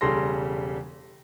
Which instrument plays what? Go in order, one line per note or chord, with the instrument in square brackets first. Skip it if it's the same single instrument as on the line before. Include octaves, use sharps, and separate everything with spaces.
[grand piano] E1 C#3 G3 A4 C6 A#6